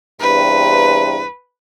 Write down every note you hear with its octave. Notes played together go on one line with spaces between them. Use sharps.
E2 G2 C3 B4